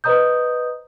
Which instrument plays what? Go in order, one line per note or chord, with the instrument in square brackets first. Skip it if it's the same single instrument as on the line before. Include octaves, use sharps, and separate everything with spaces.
[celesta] B4 C5 D#5 A#5 D#6 G6